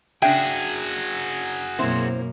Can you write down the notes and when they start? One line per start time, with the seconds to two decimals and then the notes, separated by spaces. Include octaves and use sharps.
0.22 C#3 D4 F#4 G#4 E5 G5
1.79 F#2 B2 A#3 C4 E4 C5